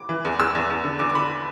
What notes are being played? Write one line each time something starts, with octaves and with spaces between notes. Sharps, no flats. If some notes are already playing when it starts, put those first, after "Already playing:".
Already playing: D6
E3
E2
E2 E6
E2
E2
D3
E2 D6
D6
D3 B5